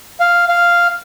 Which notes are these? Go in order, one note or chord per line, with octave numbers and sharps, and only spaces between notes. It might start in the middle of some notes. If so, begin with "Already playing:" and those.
F5
F5